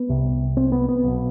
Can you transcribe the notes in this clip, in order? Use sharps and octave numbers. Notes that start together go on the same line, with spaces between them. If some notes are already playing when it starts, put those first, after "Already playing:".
Already playing: B3
C2 C3
C4
B3
B3
B1 B2